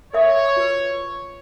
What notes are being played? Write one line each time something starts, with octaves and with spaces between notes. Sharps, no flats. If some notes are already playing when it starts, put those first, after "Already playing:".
A#4 C#5 E5 D#6
F4 B4